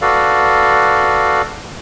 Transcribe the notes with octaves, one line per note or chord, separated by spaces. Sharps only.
F#4 A4 B4 D5 F5